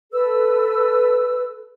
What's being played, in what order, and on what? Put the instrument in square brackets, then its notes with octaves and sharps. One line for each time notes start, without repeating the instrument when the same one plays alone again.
[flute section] A4 B4 E6